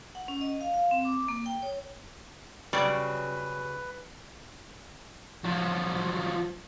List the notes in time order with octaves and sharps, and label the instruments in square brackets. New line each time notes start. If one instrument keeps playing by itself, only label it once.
[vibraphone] F#5
C#4
D#5
F5
F5
C4
D6
A#3
G5
C#5
[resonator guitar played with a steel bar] C#3 F#3 [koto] G3 D5 [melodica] B4
[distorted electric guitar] F3 F#3